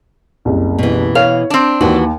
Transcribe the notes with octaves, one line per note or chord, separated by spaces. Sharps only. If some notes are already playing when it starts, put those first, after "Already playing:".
F#1 C2
B2 E3
C#5 F5
C4 D4
D#2 E3 F#4